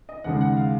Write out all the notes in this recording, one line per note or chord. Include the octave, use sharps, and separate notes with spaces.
D#5
D#2 C#3 G#3 F#5
F#5
F5